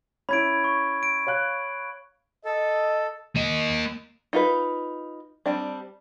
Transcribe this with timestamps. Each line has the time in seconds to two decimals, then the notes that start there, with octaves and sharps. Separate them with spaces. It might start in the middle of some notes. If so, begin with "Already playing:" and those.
0.29 C#4 E4 B5 G#6 D7
0.64 C#6
1.03 D7
1.27 C#5 F5 F#6
2.45 A4 D#5
3.36 A#3 D#5
4.33 D#4 F4 B4
5.46 G3 C4 D4